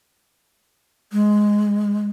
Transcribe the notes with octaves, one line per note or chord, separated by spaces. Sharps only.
G#3